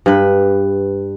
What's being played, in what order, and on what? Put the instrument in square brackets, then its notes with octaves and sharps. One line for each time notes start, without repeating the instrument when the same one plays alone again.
[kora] G2 B4